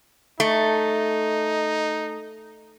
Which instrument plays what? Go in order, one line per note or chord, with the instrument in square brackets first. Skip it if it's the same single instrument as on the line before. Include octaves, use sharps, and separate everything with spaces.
[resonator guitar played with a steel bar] A3 [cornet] D#4